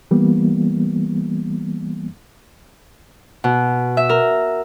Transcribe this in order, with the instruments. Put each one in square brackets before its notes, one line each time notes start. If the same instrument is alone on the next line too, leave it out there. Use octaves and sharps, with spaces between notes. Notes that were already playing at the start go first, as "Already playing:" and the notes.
[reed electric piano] E3 G3 A#3 B3
[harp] B2
E5
A#4